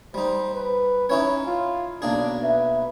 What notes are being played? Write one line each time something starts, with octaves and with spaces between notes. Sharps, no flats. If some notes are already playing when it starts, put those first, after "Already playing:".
G3 D#4 C5
B4
C#4 D#4 E4 C#5
F4
B1 A#3 D4 G#4
B4 E5